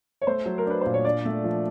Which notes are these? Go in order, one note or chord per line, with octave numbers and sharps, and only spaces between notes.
C#5
A3 C5
F#3
A#4
D4 B4
A#2 C5
C#5
D4 D5
A3
F3